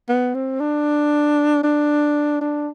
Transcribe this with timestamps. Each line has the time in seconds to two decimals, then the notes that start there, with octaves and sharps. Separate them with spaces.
0.09 B3
0.34 C4
0.60 D4
1.63 D4
2.41 D4